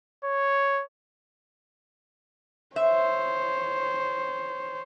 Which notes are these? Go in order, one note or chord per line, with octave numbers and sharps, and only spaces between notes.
C#5
C5 C#5 E5